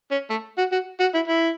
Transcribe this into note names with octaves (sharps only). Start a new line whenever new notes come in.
C#4
A3
F#4
F#4
F#4
E4
E4